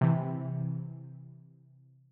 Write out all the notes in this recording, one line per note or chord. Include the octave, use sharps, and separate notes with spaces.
C3 E3